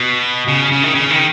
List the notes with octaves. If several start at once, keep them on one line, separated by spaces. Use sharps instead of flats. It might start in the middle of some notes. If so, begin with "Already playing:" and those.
Already playing: B2
C#3
C#3
D#3
C#3
D#3